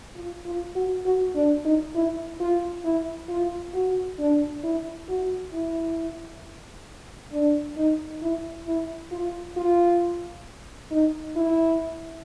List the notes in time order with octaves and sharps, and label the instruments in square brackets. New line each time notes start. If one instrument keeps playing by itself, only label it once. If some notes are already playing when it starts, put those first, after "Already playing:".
[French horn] F4
F4
F#4
F#4
D4
D#4
E4
F4
E4
F4
F#4
D4
E4
F#4
E4
D4
D#4
E4
E4
F4
F4
D#4
E4